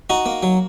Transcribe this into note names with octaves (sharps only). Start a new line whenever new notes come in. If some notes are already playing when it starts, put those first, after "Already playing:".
D#4 F#4
A#3
F#3